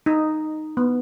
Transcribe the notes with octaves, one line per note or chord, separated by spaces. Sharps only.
D#4
B3